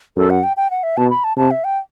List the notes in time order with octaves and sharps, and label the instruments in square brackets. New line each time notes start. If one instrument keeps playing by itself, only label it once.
[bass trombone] F#2 [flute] A4
[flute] F#5
G5
G5
F#5
E5
[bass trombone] B2 [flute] A5
[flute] B5
A5
[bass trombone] C3 [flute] A5
[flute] E5
G5